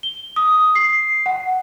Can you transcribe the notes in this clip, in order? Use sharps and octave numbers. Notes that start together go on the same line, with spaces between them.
G7
D#6
C7
F#5